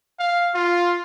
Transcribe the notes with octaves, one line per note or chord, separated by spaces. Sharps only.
F5
F4